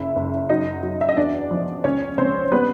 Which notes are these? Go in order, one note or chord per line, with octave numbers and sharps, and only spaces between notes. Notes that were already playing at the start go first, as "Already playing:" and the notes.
Already playing: F#1 E4 E5
F#1
F#3 D#4 D#5
F#3
E5
D#5
E2 D4 D5
F3
C#2 C#4 C#5
C#2 C4 C5
G3 B3 B4